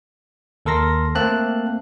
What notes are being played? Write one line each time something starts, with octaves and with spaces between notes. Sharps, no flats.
D#2 A4 A#4 C6 A#6
A3 A#3 C4 A5 F#6